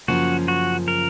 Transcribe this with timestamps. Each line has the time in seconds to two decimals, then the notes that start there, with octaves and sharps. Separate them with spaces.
0.08 F#2 C#3 F3 A#3 C#4 F#4
0.48 F#4
0.88 A#4